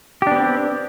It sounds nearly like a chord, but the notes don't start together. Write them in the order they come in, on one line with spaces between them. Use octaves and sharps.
G4 D4 B3 C4